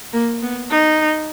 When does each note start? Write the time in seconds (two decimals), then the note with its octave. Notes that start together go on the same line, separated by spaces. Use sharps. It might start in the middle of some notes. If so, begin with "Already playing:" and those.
0.13 A#3
0.42 B3
0.70 D#4